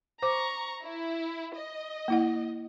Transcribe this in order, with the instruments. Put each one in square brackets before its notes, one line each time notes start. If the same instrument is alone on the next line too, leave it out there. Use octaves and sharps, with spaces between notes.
[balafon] C5 D6 [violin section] A#5 C#6
[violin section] E4
D#5
[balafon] A#3 E4 F#5